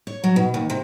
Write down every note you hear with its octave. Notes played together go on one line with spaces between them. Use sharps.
C#5
F#3
B2
D#2
C3